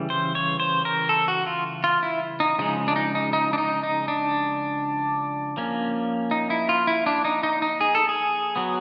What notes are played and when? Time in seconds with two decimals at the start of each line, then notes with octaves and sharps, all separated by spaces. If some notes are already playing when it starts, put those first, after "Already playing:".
Already playing: C#3 E3 G3
0.10 C5
0.35 C#5
0.60 C5
0.85 A#4
1.09 A4
1.28 F#4
1.47 F4
1.84 F4
2.03 E4
2.40 D#4
2.59 C#3 F3 G#3 D#4
2.88 D4
2.96 D#4
3.15 D#4
3.33 D#4
3.53 D4
3.58 D#4
3.83 D#4
4.08 D4
5.57 F3 A#3 C#4
6.31 D#4
6.50 E4
6.69 F4
6.87 E4
7.06 D4
7.25 D#4
7.43 D#4
7.62 D#4
7.81 G#4
7.95 A4
8.09 G#4
8.56 F#3 B3